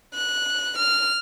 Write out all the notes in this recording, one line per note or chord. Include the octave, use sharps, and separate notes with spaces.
F#6
F6